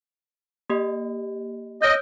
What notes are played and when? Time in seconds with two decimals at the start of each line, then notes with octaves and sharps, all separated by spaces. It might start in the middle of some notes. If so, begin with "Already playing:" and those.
0.70 A#3 G4 D#5
1.82 C#5 D#5 E6 G6